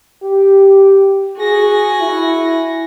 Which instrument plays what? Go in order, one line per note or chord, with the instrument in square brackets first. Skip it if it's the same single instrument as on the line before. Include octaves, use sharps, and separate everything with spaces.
[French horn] G4
[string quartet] F#4 G#5 A#6 [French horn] G#4
[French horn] E4